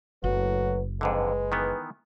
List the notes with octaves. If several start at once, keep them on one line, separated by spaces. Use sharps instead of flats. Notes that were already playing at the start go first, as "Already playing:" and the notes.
F#1 A2 F#3 F#4 B4
F2 G#2 D3 G#3 B4
D#3 E3 B3